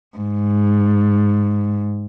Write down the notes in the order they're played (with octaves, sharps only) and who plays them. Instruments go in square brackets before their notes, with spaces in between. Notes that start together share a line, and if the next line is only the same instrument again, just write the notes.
[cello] G#2